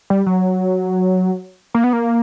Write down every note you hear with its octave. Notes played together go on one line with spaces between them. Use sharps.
G3
F#3
A#3
B3
A#3